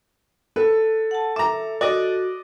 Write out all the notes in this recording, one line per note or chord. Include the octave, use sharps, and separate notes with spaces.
A4 B4
F#5 A5
E5 A#5 D6
F#4 D5 D#5